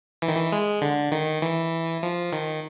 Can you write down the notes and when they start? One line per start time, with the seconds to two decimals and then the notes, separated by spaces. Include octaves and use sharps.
0.22 E3
0.28 D#3
0.36 E3
0.52 G#3
0.82 D3
1.12 D#3
1.42 E3
2.03 F3
2.33 D#3